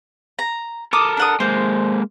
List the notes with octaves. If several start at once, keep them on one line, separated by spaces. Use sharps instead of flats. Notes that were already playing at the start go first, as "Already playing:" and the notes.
A#5
A4 A#4 D6 D#6
D4 F#5 D#6
G#3 A#3 C5